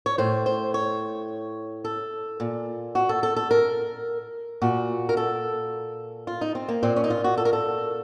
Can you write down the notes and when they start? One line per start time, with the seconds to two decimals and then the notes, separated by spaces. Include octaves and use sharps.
0.06 C#5
0.18 A2 C5
0.46 C5
0.74 C#5
1.85 A4
2.40 A#2
2.95 F#4
3.09 A4
3.23 A4
3.36 A4
3.51 A#4
4.62 A#2 F#4
5.09 A#4
5.17 A4
6.27 F4
6.41 D#4
6.55 C4
6.69 A#3
6.83 A#2 C4
6.96 C#4
7.04 D#4
7.10 F4
7.24 F#4
7.38 A4
7.45 A#4
7.53 A4